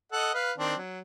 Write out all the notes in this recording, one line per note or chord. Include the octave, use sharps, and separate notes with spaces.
A4 D#5 F#5
B4 F5
D#3 C4 D4
F#3